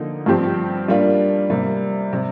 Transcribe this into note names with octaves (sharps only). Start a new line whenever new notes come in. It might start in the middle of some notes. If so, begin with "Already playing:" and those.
Already playing: D3 F3 A#3 D#4
G2 F3 C4 G4
G3 A#3 D4 F4
C3 G3 A#3
C3 G3